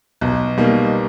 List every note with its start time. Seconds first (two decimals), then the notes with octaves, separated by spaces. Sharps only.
0.21 B1
0.57 B2 G3 A#3 D#4